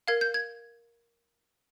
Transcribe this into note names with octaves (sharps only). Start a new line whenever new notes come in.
A#4 F5 G#6
G6
G#6